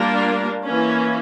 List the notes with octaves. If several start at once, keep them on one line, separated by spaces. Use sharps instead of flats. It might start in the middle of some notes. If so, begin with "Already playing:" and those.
Already playing: G3 A#3 D4 F4 A#4
E3 A#3 C#4